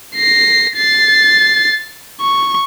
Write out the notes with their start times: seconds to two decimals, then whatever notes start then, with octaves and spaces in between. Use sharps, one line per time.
0.15 A#6 C7
0.77 A6 C7
2.21 C#6